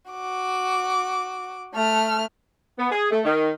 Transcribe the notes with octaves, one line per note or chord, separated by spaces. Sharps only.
F#4 D6
A3 F6
B3
G#4
A3
D#3